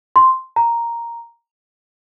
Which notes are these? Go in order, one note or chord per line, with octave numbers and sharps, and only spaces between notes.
C6
A#5